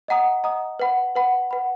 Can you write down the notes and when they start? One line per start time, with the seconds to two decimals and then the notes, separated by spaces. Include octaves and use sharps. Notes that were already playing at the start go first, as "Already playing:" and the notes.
0.08 D#5 F#5 A#5 D#6
0.44 D#5 F#5 A#5 D#6
0.80 B4 F#5 B5
1.16 B4 F#5 B5
1.51 B4 F#5 B5